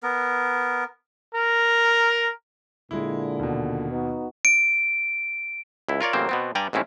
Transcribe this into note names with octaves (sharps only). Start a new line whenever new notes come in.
B3 A#4
A#4
A#2 D3 G#3 E4
D#2 B2
B3 D#4 F#4
D7
C#2 E4
F4 A#4 C#5 D5
A1 C#3 F#3 A#3 C4 C5
B2 B3 C4
G2 G3 D5 G5 G#5 A#5
A1 G#2 C4 C#4 E4